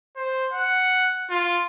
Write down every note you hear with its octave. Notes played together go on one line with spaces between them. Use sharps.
C5
F#5
F4